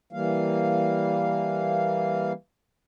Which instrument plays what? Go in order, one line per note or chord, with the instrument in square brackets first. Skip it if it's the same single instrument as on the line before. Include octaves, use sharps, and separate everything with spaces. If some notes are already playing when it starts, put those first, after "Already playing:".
[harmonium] E3 G3 A#3 F5